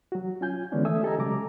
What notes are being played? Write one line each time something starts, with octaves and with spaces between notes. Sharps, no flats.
F#3 F#4
C#4 F4 G#5 G6
D3 E3 G#3 B3 C#4 D4
A3 A4 E5 G#5 D#6 E6
G4 A4 D#5 G#5 A#5
C#3 F#3 G#3 A#5 D6